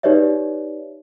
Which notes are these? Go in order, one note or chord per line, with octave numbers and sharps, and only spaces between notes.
D#4 G4 B4 C#5 D5 E5